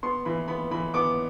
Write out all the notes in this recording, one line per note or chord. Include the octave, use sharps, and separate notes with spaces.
B3 C6
E3 B5
B3 B5
E3 B5
B3 D6